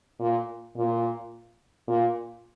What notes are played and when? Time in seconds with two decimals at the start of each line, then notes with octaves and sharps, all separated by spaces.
0.20 A#2
0.77 A#2
1.88 A#2